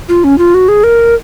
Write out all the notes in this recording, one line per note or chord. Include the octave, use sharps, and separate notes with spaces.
F4
C#4
F4
F#4
G#4
A#4